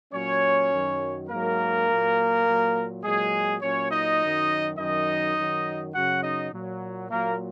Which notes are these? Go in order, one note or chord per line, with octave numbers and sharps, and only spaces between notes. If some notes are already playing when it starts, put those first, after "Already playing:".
A#2 F#3 C#4 C#5
F#2 D#3 F#3
G#2 F#3 A#3 A#4
A#2 F#3
A#2 F#3
A#2 F#3 G#3 G#4
A#2 F#3 C#4 C#5
D#4 D#5
F#2 D#3 F#3
F#2 D#3 F#3 D#4 D#5
F#2 D#3 F#3
F#2 C#3 F#3 F#4 F#5
D#4 D#5
A#2 F#3
A#2 F#3 A#3 A#4